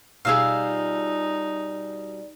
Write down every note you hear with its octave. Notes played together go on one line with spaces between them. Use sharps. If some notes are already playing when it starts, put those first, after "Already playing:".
B2 G3 D#4 F4 G#4 E5 F5